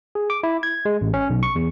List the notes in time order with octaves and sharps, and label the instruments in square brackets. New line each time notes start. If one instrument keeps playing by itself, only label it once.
[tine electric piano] G#4
D6
E4
G#6
G#3
A1
C#4
B1
C#6
E2